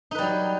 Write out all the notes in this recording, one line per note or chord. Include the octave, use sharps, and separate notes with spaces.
F#3 G3 D#4 B4